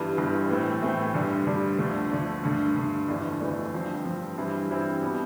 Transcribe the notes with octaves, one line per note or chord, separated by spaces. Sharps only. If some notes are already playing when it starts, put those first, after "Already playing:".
Already playing: G1 G2 E3 G3
G1 G2 E3 G3
A2 E3 A3 C4
A2 E3 A3 C4
G2 D3 G3 D4
G2 D3 G3 D4
D2 D3 F3 A3 D4
D2 D3 F3 A3 D4
G2 D3 A3
G2 D3 A3
G1 F2 E3 A3 D4
G1 F2 E3 A3 D4
G2 F3 C4
G2 F3 C4
G2 E3 G3 C4 E4
G2 E3 G3 C4 E4
B2 G3 B3